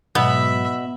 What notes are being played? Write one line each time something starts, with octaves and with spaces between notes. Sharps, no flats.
G#2 B2 F#3 B3 E5 B5